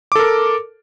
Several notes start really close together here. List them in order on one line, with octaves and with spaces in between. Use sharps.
D6 A4 A#4